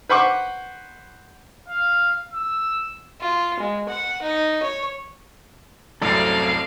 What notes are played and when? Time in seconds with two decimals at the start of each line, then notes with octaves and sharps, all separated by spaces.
0.09 B4 C5 F#5 C#6 D6
1.69 F5
2.33 E6
3.21 F4
3.60 G#3
3.89 F#5
4.22 D#4
4.63 C#5
6.02 C2 F#2 A2 C4 A4 D5 F5 D6